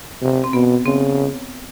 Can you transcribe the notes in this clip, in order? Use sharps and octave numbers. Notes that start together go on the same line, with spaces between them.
C3
C4
B2 B3
C#3 C4